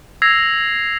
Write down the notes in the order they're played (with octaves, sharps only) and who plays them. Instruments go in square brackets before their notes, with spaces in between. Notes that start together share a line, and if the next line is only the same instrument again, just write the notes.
[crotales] E6 G#6 A#6 C7 F7